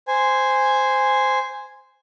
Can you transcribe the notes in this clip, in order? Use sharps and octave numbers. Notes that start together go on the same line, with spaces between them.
C5 G#5